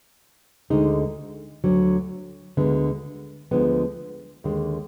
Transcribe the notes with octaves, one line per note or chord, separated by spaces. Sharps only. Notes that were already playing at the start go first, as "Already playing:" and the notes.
D2 D3 G#3 D#4
D2 D3 F#3
D2 D3 G#3 B3
D2 D3 F3 G#3 B3
D#2 D3 G#3